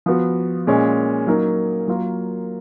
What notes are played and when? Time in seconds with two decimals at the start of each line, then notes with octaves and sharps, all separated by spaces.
0.06 F3 B3 F#4
0.67 A#2 G#3 C#4
1.27 F#3 A#3 D#4 A#4
1.88 F#3 A#3 F4 A#4